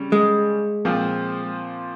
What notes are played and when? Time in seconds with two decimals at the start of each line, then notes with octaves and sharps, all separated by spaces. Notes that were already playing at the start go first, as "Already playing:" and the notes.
Already playing: C#3 G3 C#4
0.12 G#3
0.85 A#2 F3 C4 F4